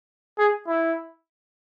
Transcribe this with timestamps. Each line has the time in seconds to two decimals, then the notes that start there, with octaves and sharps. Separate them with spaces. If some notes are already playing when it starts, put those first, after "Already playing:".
0.39 G#4
0.68 E4